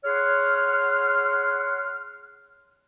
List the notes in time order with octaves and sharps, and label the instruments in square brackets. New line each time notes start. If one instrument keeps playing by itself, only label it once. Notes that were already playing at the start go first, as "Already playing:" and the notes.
[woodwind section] G#4 C#5 F#5 C6 F6